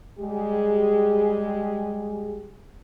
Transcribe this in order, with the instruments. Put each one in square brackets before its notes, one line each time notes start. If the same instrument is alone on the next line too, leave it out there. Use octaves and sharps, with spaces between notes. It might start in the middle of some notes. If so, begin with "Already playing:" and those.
[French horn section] G3 G#3 G4 G#4